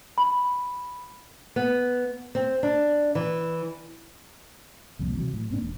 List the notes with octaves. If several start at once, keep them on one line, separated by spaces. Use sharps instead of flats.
B5
B3
C4
D4
E3
C2 F2 A#2
C3 E3 F#3
A2
G#2 A#3 C4 D4
E1